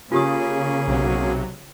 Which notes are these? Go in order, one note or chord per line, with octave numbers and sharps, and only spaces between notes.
C#3 A#3 C#4 F4 G4 G#4 D#6
B1 C3 F#3